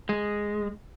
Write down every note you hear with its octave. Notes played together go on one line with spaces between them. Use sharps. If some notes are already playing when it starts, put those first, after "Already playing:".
G#3